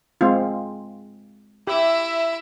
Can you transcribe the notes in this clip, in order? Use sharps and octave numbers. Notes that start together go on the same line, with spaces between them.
G#3 C4 F4
E4 G4 E5